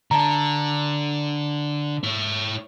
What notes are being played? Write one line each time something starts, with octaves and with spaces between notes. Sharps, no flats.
D3 A5 A#5
E4 C#5